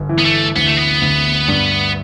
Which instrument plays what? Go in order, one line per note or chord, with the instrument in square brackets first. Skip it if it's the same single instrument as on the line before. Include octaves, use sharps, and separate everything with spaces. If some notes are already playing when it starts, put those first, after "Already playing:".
Already playing: [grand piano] G1
E3
[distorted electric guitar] B3
A3
[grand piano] D2 [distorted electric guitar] B3
[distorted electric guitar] A3
B3
[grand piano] D2
G2